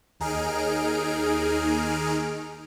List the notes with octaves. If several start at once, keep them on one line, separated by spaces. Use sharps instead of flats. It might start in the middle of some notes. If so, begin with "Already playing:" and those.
D#2 D#4 G#4 F6 D7